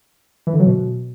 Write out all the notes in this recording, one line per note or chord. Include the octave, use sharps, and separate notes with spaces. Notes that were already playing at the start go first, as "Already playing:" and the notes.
E3
D3
F#3
B2